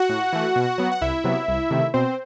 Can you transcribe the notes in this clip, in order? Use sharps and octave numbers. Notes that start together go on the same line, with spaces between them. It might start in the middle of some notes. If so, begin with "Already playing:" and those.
Already playing: F#4 F#5
A2
E3 A3
B2
F#3 B3
F#5
C2 E4 E5
C3 F#3 B3
C2
C3 D#3 A3
B2 C4 C5